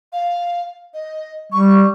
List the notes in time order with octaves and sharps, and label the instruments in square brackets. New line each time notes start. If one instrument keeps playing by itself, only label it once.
[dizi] F5
D#5
[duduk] G3 [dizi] C#6